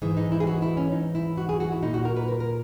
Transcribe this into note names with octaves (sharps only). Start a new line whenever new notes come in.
G#2 E3 G#3
D#4
E4
G#4
F#4
E4
C#4
D#4
E4
F#4
G#4
F#4
E4
A#2 D#4
F#4
A#4
B4
A#4
A#4